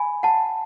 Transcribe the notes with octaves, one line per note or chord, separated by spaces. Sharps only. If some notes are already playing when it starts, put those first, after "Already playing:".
Already playing: G#5 B5
F#5 A5